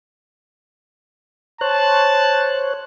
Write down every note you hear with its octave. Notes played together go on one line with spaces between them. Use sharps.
C5 C#5 A5 F#6